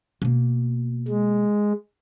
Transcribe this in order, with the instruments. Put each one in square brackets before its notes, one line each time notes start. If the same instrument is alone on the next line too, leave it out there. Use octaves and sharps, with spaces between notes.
[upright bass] B2 A#3
[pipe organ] G#3